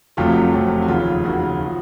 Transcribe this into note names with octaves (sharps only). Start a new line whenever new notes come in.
F1 F2 C3 F#3 A3 F4
F1 F2 C3 F#3 A3
F#4
F1 D#2 C#3 F4
F1 D#2 C#3 F#4
F3